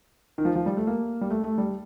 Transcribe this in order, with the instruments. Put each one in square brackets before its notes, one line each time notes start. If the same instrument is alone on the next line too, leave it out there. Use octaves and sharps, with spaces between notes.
[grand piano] D#3
F3
F3
G3
A3
A#3
G3
A3
A3
G3